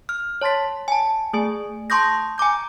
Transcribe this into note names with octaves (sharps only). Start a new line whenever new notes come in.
F6
C#5 A5 C6 A6 B6
G#5 A5
A3 G#4 G#5
A5 C6 C#6 D#6 G6 A#6
G#5 A#5 D6 G6